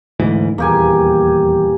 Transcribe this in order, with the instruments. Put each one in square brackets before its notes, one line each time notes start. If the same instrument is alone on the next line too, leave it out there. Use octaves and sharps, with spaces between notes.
[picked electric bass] D2 G#2 E3
[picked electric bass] D#1 E2 [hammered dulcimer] A#3 G4 G#5